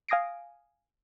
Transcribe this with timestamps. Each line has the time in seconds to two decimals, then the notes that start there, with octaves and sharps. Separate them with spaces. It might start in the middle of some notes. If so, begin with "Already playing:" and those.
0.09 F5 G#5 D#6 A#6 C7 D7